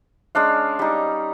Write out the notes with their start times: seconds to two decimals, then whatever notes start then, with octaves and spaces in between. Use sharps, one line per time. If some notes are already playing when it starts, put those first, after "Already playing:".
0.35 G#3 C#4 D4 F5
0.79 G3 D#4